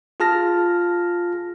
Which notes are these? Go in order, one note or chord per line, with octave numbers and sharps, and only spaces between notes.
F4 G#4 A5 F6 A#6